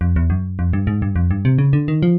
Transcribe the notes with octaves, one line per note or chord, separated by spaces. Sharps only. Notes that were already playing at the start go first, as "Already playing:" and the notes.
F2
E2
F#2
F2
G2
G#2
G2
F2
G2
C3
C#3
D3
D#3
F3